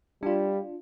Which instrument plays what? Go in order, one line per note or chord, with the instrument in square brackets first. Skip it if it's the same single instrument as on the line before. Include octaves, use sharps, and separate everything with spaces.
[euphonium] G3 [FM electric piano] D4 F4